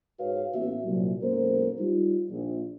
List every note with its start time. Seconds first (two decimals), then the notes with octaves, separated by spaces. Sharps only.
0.20 G#2 F#4 B4 C#5 F5
0.53 A1 A#3 B3 F#4 B4 E5
0.84 C2 A#2 F#3
1.22 B1 F#2 G#3 A#3 A#4 C5
1.80 G3 D#4 F4
2.30 A#1